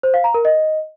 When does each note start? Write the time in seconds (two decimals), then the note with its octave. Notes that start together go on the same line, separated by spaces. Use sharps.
0.03 C5
0.14 F5
0.24 A#5
0.34 A#4
0.45 D#5